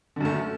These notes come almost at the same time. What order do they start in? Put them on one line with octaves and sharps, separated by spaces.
D3 F#2 A3